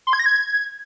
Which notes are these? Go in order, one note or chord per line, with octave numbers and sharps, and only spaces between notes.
C6
G#6
A#6
G#6